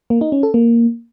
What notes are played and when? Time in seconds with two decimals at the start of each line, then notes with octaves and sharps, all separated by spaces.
0.10 A#3
0.21 D#4
0.32 C#4
0.43 A4
0.54 A#3